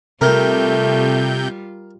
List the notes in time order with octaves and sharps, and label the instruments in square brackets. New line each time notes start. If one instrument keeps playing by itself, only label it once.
[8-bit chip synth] C3 G6 [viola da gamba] G3 F4 [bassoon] A3 [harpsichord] A#4